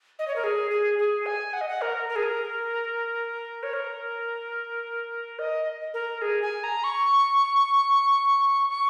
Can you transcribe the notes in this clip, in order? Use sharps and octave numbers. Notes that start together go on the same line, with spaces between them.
D#5
C#5
A#4
G#4
G#4
G#4
G#5
F#5
D#5
F#5
A#4
A#4
G#4
A#4
C#5
A#4
D#5
A#4
G#4
G#5
A#5
C#6
C#6